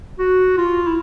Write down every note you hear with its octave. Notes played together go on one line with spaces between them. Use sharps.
F#4
F4
E4